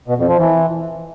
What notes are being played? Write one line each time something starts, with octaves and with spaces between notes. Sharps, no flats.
B2
F2
F3
E3